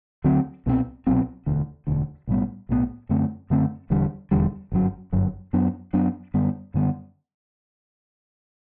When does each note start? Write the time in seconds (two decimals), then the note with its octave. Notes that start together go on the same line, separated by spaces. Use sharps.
0.24 D2 D3 F#3 C4
0.66 C2 B2 F#3 C4
1.07 C2 B2 F#3 C4
1.46 E1 D2 D3
1.87 E1 D2 D3
2.27 B1 A2 G3 B3
2.69 B1 A2 G3 B3
3.09 F#2 D3 A3 C4
3.50 F#2 D3 A3 C4
3.90 E1 E2 D3 G3
4.31 E1 E2 D3 G3
4.72 G1 F#2 F#3
5.13 G1 F#2 F#3
5.53 F#2 F#3 B3 D4
5.93 F#2 F#3 B3 D4
6.34 F#2 D3 G3 B3
6.74 F#2 D3 G3 B3